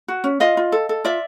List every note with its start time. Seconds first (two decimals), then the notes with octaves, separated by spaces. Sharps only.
0.08 F#4
0.24 C#4
0.40 F4 D#5 F5
0.57 F4
0.72 A4
0.89 A4
1.04 F4 D5 E5